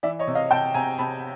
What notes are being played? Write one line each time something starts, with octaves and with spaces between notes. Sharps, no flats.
E3 D5 E5
C#5 D#5
C3
D#5 F5
C3 G5 A5
C3 G#5 A#5
C3 A5 B5